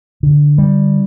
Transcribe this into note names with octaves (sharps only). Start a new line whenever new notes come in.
D3
G3